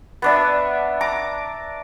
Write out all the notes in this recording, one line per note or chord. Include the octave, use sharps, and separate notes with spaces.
B3 D4 E5
A#5 D6